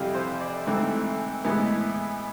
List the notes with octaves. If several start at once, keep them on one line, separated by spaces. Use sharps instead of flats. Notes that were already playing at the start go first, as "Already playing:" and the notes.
Already playing: F2 C3 E3 G3 F5
C5
D5
G#2 E3 A3 C4
A2 E3 G#3 B3